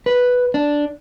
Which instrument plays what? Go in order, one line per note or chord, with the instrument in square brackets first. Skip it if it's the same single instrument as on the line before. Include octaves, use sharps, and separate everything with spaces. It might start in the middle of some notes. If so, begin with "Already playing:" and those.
[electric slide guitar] B4
D4